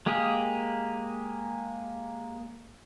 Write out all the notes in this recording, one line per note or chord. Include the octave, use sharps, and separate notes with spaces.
G#3 A#3 G4 G#4